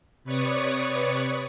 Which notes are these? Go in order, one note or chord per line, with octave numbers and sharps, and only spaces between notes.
C3 B4 C#5 D5 C#6 D#6